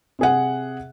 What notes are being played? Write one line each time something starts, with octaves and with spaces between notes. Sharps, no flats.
C3 G#4 F#5